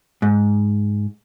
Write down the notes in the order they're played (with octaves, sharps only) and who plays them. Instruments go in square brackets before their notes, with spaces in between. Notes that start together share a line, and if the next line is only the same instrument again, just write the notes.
[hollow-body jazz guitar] G#2